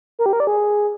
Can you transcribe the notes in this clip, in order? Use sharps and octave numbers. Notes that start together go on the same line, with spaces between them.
A#4
G4
A#4
D5
G#4